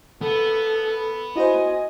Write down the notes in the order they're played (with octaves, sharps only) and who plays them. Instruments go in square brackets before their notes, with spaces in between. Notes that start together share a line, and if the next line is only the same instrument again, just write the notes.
[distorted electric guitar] B3 [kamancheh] A4
[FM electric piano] E4 F#4 C5 [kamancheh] D#5 G#5